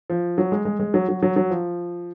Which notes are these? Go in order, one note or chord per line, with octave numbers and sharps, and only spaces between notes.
F3
F#3
G#3
G#3
G#3
F#3
F#3
F#3
F#3
F3